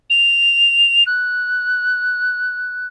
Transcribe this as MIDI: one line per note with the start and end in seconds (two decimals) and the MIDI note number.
0.10 1.03 101
1.06 2.87 90